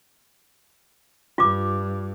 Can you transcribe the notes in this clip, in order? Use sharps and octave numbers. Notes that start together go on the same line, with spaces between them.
G2 F4 D6